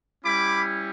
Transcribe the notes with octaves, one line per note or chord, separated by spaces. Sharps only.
G3 C#4 E4 G4 B5 D6